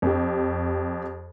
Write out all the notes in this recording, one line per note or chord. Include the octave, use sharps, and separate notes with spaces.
F2 G4